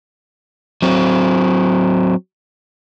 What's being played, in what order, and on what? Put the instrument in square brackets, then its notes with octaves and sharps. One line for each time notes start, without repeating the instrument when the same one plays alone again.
[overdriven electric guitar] F#3 C4